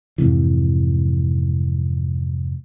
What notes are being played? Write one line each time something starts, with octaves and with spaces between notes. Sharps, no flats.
F2 G#2 C3 E3